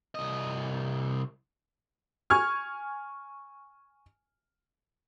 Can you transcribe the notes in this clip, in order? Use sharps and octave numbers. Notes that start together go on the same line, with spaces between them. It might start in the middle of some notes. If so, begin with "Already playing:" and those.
C2 D#5
G#5 C#6 F6 G#6